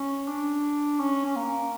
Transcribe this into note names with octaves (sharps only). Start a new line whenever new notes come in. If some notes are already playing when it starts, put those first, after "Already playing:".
Already playing: C#4
D4
C#4
C#4
A#3